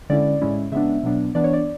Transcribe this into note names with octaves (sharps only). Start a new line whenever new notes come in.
D3 G#3 C#4 E4 D5
A2 G#3 C#4 E4
C#3 G#3 B3 D4 E5
B2 F#3 B3 D4
E3 B3 D4 D5
C#5
D5